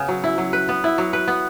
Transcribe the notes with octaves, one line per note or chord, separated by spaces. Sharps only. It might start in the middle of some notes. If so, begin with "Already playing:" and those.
Already playing: C#3 B3
F#3
E4
F#3
B4
B3
E4
F#3
B4
B3